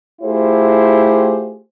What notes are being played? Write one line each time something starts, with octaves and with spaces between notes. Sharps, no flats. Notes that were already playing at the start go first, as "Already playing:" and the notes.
A3 E4 F4 G4 G#4 C5